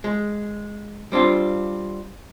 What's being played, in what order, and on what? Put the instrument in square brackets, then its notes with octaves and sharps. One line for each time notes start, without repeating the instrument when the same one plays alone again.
[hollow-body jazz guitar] G#3
G3 C4 D4 F4